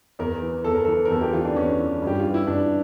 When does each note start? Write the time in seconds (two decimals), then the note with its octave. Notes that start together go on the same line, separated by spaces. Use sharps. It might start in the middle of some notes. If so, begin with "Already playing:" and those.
0.19 E2 A#4
0.42 E3
0.65 E2 A4
0.75 A#4
0.85 E3 A4
1.05 A#4
1.10 E2 A4
1.21 G4
1.33 E3 F4
1.45 D4
1.56 E2 C#4
1.78 E3
2.02 G2
2.07 G4
2.20 E3 F4
2.34 E4
2.47 G2 D4